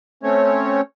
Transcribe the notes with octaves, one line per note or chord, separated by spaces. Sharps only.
A3 C4 C#4 C#5